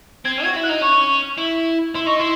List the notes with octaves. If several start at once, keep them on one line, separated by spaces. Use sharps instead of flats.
C4 G#6
F#4 G#6
E4
F#6
D#4
C#4 C#6
E4
E4 C6
D#4 C#6
E4 C6